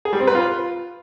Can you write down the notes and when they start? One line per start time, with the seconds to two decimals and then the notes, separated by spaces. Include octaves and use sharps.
0.05 G#4
0.13 G3
0.20 C4
0.27 B4
0.35 F4